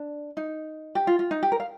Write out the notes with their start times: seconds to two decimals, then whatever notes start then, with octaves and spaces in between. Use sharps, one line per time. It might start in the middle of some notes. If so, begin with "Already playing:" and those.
Already playing: D4
0.37 D#4
0.95 G4
1.07 F4
1.19 F4
1.31 D#4
1.43 G4
1.52 A#4
1.60 F5